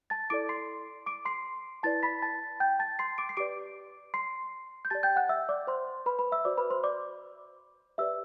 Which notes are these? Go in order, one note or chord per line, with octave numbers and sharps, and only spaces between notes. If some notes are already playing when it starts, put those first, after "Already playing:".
A5 A6
E4 A4 D5 D6 D7
C6 C7
D6 D7
C6 C7
E4 B4 D5 A5 A6
B5 B6
A5 A6
G5 G6
A5 A6
C6 C7
D6 D7
C7
G4 B4 D5 D6 D7
C6 C7
G6
G4 D5 A5 A6
G5 G6
F#5 F#6
E5 E6
D5 D6
C5 C6
B4 B5
B4 B5
E5 E6
F#4 C5 D5 D6
B4 B5
C5 C6
D5 D6
G4 B4 D5 E5 E6